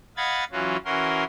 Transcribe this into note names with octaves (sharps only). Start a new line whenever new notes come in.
D#5 F5 F#5 B5 G#6 A6
E3 F#3 C#4 F4 F#4
E3 C#4 F#4 A#4 C6